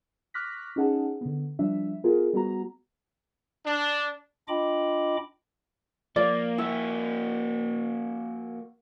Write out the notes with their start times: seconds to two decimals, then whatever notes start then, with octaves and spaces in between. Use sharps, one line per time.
0.34 C#6 D6 F6 F#6 A#6 B6
0.76 C#4 D#4 G#4 F#5 A5
1.21 D3 B3
1.59 F3 G3 D4 E5
2.04 B3 F4 G#4 A#4
2.33 G3 B3 F#4 A#5
3.65 D4
4.48 D4 F4 D#5 G5 B5 D6
6.16 F3 A#3 D5
6.58 A#3 E4 F#4